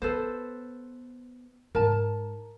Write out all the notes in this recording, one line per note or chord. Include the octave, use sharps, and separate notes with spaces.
B3 A4 B4 C5
G#2 A#4 A5